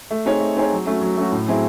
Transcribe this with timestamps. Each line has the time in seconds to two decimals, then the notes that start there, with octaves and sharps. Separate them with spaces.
0.11 A3
0.25 C4 D#4 G#4 C#5
0.41 A3
0.57 C4 D#4 G#4 C#5
0.72 F#3
0.86 A3 C#4 F#4
1.01 F#3
1.17 A3 C#4 F#4
1.32 A2
1.48 F#3 C4 E4 G#4